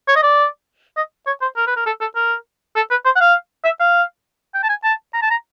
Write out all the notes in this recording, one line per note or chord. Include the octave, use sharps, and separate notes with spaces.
C#5
D#5
D5
D#5
C#5
C5
A#4
B4
A#4
A4
A4
A#4
A4
B4
C5
F#5
F5
E5
F5
G5
A5
G#5
A5
A#5
A5
A#5